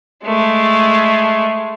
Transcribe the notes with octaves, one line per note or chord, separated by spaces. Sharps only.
G#3 A3